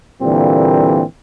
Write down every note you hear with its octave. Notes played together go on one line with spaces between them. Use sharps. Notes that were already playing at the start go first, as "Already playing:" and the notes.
A#2 D3 E3 G3 A#3 C4